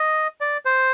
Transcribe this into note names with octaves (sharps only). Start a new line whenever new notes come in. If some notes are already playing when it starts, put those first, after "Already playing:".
Already playing: D#5
D5
C5